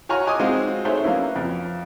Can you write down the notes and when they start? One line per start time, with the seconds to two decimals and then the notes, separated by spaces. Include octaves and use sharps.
0.09 F#4 C#5 G#5 A#5 C#6 F6
0.27 D#5 G#5 D6 D#6
0.39 G#3 C4 D#4 F4 F#4
0.85 A3 D#4 G#4 C5 C#5 E5
1.04 F#3 A#3 B3 C#4 E4
1.36 F2